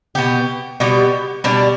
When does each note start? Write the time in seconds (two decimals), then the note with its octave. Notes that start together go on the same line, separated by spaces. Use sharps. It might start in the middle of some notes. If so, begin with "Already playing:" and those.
0.15 B2 B3 G4
0.80 B2 G3 B3 G4
1.44 B2 G3 D4